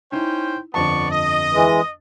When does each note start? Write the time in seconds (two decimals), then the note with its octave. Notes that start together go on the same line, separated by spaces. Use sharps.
0.12 C#4 D#4 E4 C5 G5
0.74 G1 F2 B3 D5 A5 C#6
1.12 D#5
1.53 E3 G#3